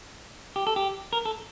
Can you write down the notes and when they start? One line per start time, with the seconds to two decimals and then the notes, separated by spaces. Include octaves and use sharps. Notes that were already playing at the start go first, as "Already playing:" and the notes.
0.56 G4
0.67 A4
0.76 G4
1.13 A#4
1.25 A4